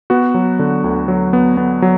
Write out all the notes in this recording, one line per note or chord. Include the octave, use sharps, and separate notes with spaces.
B3 F#4
F#3
D3
D2
F#3
B3
B3
F#3